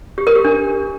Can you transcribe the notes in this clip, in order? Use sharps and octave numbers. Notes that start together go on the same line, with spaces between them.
G4
A#4
G4
D4